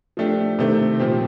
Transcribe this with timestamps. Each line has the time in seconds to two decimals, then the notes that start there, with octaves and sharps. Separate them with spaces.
0.17 F3 A3 D4 G4
0.59 C3 D#3 A3 C4
1.00 A#2 F3 C4 G4